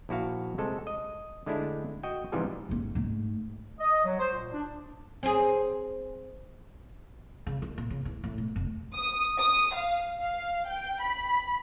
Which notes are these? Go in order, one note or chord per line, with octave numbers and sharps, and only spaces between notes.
A#1 E4 F#4 F5
C3 G#3 A4
D#5
D3 G#3 A3 D4 E4
F#4 D#5 G5
G#2 C3 E3 F3 G3 G#3
A1 G#2
G#2 A3
D#5
F#3
C5
A#2
D4
C4 G#4
C#3
D#3
A#2
C#3
E3
A2
B2
F1
D#6
D#6
F5
F5
G5
B5